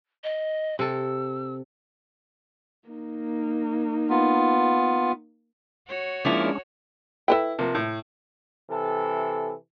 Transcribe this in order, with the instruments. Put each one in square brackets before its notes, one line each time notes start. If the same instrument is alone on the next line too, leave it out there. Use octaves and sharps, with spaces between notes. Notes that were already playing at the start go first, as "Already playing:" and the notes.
[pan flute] D#5
[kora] C3 A4 [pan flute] E6
[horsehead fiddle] A#3 D#4
[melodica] B3 F4
[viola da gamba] F#4 C#5
[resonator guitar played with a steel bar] F3 A#3 E4 [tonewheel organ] G#3 C#4 D4
[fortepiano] E4 E6 [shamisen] A4 B4 G5
[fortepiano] C3 F3 A#3
A2
[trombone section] C3 E3 A4